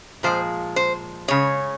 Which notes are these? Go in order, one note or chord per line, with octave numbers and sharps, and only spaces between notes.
A#2 F3 G#3 C5
C5
C#3 G#3 C#5